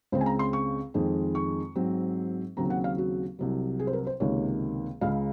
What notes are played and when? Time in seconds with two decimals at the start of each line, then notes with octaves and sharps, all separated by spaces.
0.12 C#2 C#3 G#3 C4 C5
0.21 G#5
0.26 A#5
0.39 C6
0.53 C#6
0.94 F2 D#3 G#3 C4
1.35 C#6
1.75 G#2 F#3 C4
2.57 D#2 C#3 F#3 C4 A#5
2.70 F#5
2.84 F5
2.98 F#4
3.39 C2 C3 F#3
3.79 G#4
3.87 C5
3.93 A#4
4.07 C5
4.20 C#2 C3 D#3 A#3 C#5
5.01 C#2 C#3 G#3 F5